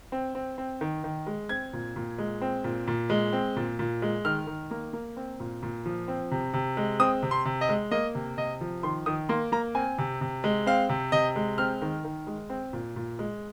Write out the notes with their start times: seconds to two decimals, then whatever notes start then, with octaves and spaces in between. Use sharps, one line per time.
0.12 C4
0.35 C4
0.58 C4
0.81 D#3
1.04 D#3
1.27 G#3
1.49 C4 G#6
1.73 A#2
1.96 A#2
2.18 G#3
2.41 C4
2.64 A#2
2.87 A#2
3.10 G#3
3.33 C4
3.57 A#2
3.79 A#2
4.02 G#3
4.25 D#3 F6
4.47 D#3
4.71 A#3
4.93 A#3
5.17 C4
5.40 A#2
5.63 A#2
5.86 F3
6.08 C4
6.31 C3
6.54 C3
6.77 G#3
7.00 C4 D#6
7.23 C3
7.31 C6
7.45 C3
7.61 D#5
7.69 G#3
7.91 A#3 D#5
8.15 C3
8.37 C3 D#5
8.61 F3
8.83 D#3 C6
9.06 D#3 D#6
9.29 A#3 C6
9.52 A#3 A#5
9.75 C4 G#5
9.98 C3
10.21 C3
10.44 G#3
10.66 C4 F5
10.89 C3
11.12 C3 D#5
11.36 G#3
11.58 C4 F6
11.82 D#3
12.04 D#3
12.27 G#3
12.50 C4
12.73 A#2
12.96 A#2
13.19 G#3